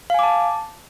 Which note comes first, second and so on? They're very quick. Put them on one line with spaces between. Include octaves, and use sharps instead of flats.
F5 G#5 D6 A5